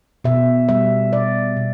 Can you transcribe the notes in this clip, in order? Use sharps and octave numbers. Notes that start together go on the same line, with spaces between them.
B2 E5
G3 E5
B2 D5
B2